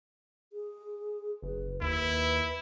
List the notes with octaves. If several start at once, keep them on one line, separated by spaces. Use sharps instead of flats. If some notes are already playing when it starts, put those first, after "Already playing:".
G#4
F#1 B4
D#2 E4 B4